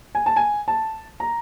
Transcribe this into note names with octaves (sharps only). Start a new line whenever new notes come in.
G#5
A5
G#5
A5
A#5